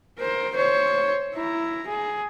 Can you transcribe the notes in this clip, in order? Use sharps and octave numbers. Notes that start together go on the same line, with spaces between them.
A#4 C5
C5 C#5
E4 A#5
G#4